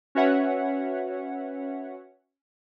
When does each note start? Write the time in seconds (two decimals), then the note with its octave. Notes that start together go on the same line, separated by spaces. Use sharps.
0.15 C#4 F#4 B4 C#5 E5 F#5